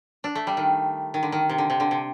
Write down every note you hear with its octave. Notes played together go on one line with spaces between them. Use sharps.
D4
A3
G3
D#3
D#3
D3
D#3
C3
D3
C3
D3
C3